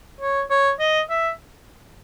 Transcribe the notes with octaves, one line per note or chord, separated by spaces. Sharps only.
C#5
C#5
D#5
E5